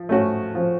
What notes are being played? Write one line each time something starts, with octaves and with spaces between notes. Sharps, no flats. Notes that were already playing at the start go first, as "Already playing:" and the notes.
Already playing: F3
A3 C#4 F#4
F3